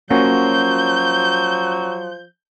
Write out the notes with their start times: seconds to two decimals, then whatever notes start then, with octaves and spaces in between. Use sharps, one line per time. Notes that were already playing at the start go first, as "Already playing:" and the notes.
0.10 F3 F#3 A#3 C#4 F#4 G6